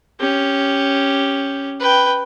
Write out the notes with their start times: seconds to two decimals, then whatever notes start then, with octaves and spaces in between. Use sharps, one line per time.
0.20 C#4 G4
1.80 B4 G5